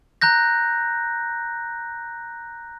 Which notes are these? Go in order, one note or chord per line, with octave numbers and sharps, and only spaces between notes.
A#5 F#6 G6 A#6